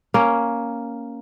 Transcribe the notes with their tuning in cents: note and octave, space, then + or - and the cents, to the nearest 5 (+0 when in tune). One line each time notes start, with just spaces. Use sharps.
A#3 +0 C#4 +0